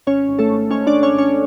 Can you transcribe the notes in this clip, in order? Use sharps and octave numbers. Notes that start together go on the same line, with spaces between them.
G#1 C#4 C#5
G#1
A3 A4
G#1
G#2 C#4 C#5
G#2 D4 D5
C#4 C#5
G#1 C#4 C#5